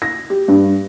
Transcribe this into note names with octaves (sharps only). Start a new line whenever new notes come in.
A#6
G4
G2